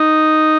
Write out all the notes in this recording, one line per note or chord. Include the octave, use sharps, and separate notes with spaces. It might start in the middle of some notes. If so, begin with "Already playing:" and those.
Already playing: D#4